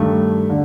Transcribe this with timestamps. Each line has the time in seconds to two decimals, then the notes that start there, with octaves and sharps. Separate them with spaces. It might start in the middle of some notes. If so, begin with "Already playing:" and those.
Already playing: G2 D#3 A3
0.50 D3